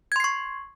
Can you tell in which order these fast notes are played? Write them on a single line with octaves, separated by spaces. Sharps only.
G#6 C6 C7 C#6